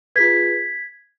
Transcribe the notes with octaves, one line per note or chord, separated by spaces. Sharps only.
F4 G#4 B4 G#6 B6